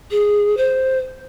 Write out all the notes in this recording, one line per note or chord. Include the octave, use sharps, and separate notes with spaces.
G#4
C5